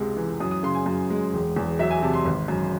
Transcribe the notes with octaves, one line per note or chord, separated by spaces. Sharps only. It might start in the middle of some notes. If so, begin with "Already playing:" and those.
Already playing: C#2 C3 G#3
E3
F#2 D#6
D#6
C#3 C6
G#5
F#2
G#3
E1
E2
F#3 E5
G#5
C3 A5
C6
G#1
F#2